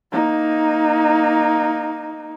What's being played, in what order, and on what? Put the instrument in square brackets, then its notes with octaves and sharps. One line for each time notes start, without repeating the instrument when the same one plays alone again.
[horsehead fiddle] A#3 D#4